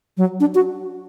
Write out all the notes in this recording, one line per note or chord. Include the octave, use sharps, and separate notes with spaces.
F#3
D4
F#4